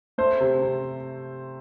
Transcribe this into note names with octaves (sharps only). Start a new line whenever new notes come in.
A3 C5
C3
C3